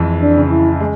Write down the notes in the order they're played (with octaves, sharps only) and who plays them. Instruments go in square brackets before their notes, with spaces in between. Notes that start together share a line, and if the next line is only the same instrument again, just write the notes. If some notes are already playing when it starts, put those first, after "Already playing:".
Already playing: [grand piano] F2 E3 G#3
[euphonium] D4
[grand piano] C#3
[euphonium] E4
[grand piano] G#3